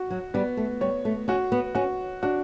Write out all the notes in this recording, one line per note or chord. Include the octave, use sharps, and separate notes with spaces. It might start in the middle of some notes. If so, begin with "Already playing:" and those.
Already playing: F#4
F#3
G3 B3
A3
G3 C#5
A3
C#4 F#4
B3
C#4 F#4
D4 F#4